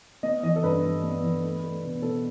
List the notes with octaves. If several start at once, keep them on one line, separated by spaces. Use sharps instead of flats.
B3 D#5
E3 D#5
A4
G2 B4
G3
B3
E3
A3
A3
B2
B2 A4